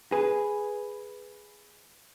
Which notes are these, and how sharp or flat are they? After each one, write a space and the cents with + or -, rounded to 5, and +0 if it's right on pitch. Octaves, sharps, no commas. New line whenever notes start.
G#4 +0 B4 +0